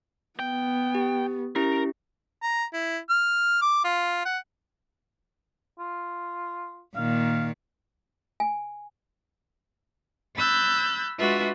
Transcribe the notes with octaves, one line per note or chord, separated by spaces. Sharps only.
B3 G5
G4
C#4 E4 G4 A#4
A#5
E4
F6
D6
F4
F#5
F4
A#2 D#3 F5
G#5
B5 E6 F#6 G6 A6
G#3 D4 F4 F#4 B4 E5